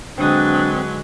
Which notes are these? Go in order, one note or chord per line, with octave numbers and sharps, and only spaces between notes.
D3 F#3 G#3 C4 D4 B4 D#6